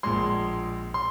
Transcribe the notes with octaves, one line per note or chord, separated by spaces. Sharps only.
A#1 A#2 G#3 C6
C6